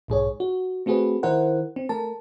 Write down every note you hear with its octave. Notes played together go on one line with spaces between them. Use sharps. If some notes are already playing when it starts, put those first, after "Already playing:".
B1 G#2 G#4 C#5
F#4
A3 C4 F#4 G#4 B4
D#3 E4 A#4 C5 F#5
C4
A3 A#4 A5